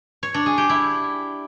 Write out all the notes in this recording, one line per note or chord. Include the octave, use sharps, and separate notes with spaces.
C#5
D4
G#4
G4
E4